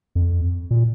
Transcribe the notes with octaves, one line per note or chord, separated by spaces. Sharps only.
F2
A#2